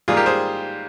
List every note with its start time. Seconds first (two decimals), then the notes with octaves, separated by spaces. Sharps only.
0.08 G#2 G3 A#3 F4 G#4
0.17 G4 A#4
0.26 G#4 C5